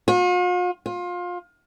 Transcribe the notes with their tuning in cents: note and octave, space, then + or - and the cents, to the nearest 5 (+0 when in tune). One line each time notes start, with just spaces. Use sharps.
F4 +45
F4 +25